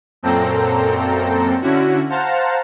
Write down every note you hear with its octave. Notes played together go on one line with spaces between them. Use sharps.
F#2 A#2 C4 A4 G5 A#5
D3 C#4 E4 F#4
C5 F5 F#5 A5 A#5